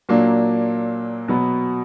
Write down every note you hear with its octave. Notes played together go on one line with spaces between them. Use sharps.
A#2 F#3 A#3 D4
B2 F#3 B3